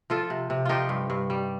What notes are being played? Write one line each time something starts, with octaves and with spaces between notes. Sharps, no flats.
F3 F4 A4
C3
C3
F3 D#4 F4 G4
G2
G2
G3